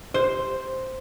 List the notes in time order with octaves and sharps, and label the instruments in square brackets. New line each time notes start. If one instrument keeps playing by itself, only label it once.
[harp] C5